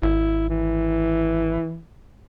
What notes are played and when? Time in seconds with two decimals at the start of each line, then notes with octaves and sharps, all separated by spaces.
0.03 G#1 E4
0.49 E3